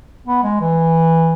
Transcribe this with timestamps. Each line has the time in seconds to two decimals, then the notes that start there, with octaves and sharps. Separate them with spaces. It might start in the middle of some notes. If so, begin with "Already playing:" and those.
0.26 B3
0.43 G#3
0.61 E3